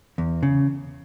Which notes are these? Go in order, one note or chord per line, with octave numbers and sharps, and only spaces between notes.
E2
C#3